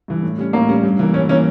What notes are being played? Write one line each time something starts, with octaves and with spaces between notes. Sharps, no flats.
G2 E3
A2
G3 C#4
A2 A#3
G3 C#4
G2
E3 A#3
G2 C#4
E3 A#3 C#4